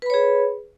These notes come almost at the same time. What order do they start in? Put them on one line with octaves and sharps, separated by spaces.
B4 B5 C#5 G#4